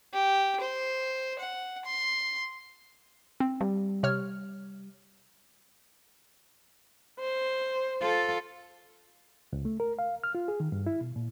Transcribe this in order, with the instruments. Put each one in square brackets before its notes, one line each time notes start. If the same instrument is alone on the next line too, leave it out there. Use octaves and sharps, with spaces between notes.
[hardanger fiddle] G4
C5
F#5
C6
[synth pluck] C4
[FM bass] G3
[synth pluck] C3 C#5 F6
[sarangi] C5
[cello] F4 A4
[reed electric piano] C#2
A3
A#4
F5
F6
F4
G#4
D#3
G2
E4
B2
A#2